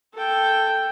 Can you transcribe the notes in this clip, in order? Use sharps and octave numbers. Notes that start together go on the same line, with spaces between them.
A4 G5